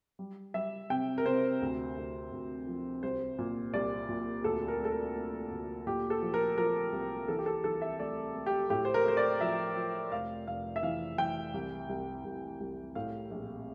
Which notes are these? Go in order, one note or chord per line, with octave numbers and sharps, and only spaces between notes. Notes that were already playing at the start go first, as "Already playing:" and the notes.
G3
G3 E5
C3 G5
A#4
C3 C5
D2
D2
D2
F3
C2 C5
A#2
C2 D5
A#2
D2 A4
A#4
A3 A4
A#4
A3
D2
A#2 G4
A4
F3
A#4
F3 A#4
C2
E3 A4
G4
A4
E3 A4
E5
A3 D5
A3
G4
A2 G4
C5
A#4
A3 C5
D5
F3 E5
F3
F1 F5
F1 F5
E5
E3 F5
E3 G5
C2
C2
C2
C2
A2 F5
A#1